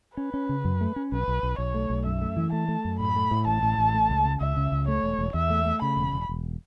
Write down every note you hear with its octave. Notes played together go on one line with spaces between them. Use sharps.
C#4 B4
C#4
C#3
F#2
A3
C#4
B1 B4
B1
B1
B1 C#5
A3
B1
F#2 E5
A3
E3
A3 A5
A3
F#2
A2 B5
A3
A2
A1 A5
A2
A1
A3
C#2
C#3
C#2 E5
C#3
C#2
A3 C#5
E1
E1
E2 E5
A3
A3
C#3 B5
E1
E1
E1